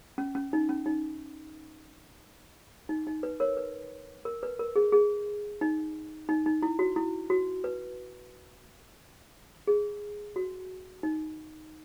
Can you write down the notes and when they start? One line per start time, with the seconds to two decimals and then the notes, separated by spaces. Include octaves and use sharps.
0.18 C#4
0.35 C#4
0.53 D#4
0.69 C#4
0.86 D#4
2.89 D#4
3.07 D#4
3.23 B4
3.40 A#4 C#5
3.57 B4
4.25 A#4
4.43 B4
4.59 A#4
4.76 G#4
4.92 G#4
5.61 D#4
6.29 D#4
6.46 D#4
6.62 E4
6.79 F#4
6.96 E4
7.30 F#4
7.64 B4
9.67 G#4
10.36 F#4
11.03 D#4